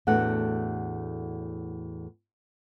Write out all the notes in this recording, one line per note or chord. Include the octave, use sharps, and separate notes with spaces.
E2 A2 A3 D4 F#4 F#5